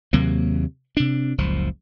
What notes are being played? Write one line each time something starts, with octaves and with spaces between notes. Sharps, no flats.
D#2 C3 F#3 A#3
C3 D4
F#1 C#2 F3